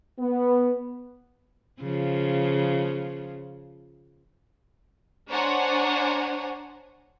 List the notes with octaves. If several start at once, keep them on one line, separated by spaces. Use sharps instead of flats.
B3
C#3 F3
D4 C5 C#5 F#5 G#5 A#5